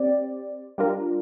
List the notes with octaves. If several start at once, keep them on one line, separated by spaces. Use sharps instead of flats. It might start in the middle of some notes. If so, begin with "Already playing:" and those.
Already playing: C4 G4 D5
G3 D4 F4 A#4